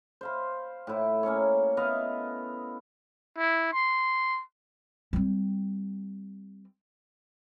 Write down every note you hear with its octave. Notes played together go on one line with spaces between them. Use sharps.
C5 F5 B5
A2 E4
A#3 C#4 A4 C#5
B3 E4 D#5 F5
E4
C6
G3 C4